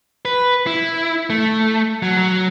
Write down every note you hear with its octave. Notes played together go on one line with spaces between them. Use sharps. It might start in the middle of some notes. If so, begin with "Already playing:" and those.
B4
E4
A3
F#3
F#3